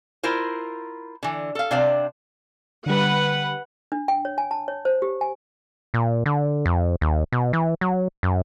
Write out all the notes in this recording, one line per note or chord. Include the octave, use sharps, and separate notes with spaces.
E4 F4 A#4 C5
D3 E3
A4 F5
C3 D4 C5 D5 F5
D3 G3 B4 F#5
D4
G5
C#5
G#5
A5
C#5
C5
G4
G#5
A#2
D3
F2
D#2
B2
E3
F#3
F#2